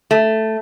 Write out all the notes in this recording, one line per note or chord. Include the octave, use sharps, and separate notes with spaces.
A3